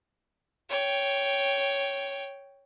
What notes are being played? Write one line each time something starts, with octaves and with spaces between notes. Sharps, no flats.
C#5 G5